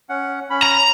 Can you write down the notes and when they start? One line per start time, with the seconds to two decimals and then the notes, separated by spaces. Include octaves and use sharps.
0.09 C#4 F#5
0.50 C#4 B5
0.63 A#5